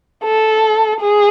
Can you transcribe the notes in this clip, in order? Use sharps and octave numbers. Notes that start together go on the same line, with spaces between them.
A4
G#4